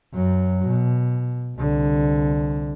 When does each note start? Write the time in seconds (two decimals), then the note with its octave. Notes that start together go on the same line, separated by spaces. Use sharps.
0.14 F#2 F#3
0.68 B2
1.57 C2 D3